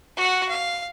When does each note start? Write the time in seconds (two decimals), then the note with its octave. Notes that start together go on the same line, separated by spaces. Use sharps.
0.16 F#4 F#5
0.49 F5